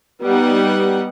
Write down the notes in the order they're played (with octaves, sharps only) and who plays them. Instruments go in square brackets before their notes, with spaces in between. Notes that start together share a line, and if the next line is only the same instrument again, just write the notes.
[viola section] G3 B3 D#4 F#5